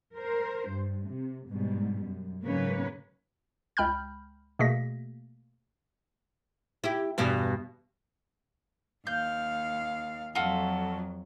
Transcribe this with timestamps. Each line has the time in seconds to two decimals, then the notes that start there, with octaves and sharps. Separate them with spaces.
0.16 A#4 C5
0.69 G2
1.09 C3
1.48 G#2 B2 G3
2.03 F#2
2.43 G#2 C#3 F#3 A#3 B4 C#5
3.77 C#2 G#3 G5 B5 F6 G6
4.59 B2 A3 A#3 G#4 A#6 B6
6.84 E4 G4
7.18 E2 G2 B2
9.07 D#2 F5 G6
10.35 F2 F#3 F4 F#4 A4